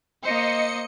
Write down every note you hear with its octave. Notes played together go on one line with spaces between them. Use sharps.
A#3 C5 D#5 C#7